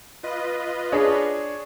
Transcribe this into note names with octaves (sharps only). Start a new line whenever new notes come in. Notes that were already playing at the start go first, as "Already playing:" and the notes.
F4 B4 D#5
D4 G#4 C#5